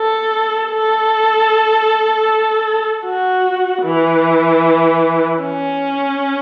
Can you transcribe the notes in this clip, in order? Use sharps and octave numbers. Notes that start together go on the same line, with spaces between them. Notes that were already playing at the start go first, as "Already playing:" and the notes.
Already playing: A4
A4
F#4
E3
C#4